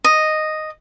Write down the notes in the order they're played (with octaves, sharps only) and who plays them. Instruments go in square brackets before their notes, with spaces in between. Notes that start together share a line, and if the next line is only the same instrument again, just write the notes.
[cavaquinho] D#5